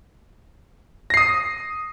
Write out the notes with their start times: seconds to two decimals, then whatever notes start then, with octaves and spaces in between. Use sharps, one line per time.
1.10 A#6
1.14 C7
1.17 D#6